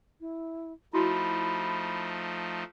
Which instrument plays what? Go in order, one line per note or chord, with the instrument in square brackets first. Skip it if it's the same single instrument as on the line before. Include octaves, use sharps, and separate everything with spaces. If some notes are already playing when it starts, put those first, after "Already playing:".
[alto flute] E4
[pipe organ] F3 A3 D#4 [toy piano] E4 F#4 [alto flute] B5